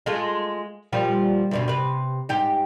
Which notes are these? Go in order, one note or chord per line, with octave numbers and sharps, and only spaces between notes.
G#3 A3 F4
A#2 F3 G3
D2 G2 B2
C3 B4
G#2 G4